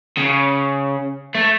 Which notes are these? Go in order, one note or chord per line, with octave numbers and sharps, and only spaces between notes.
C#3
A3